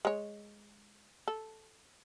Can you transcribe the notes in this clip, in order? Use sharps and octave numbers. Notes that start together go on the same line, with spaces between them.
G#3 C#5
A4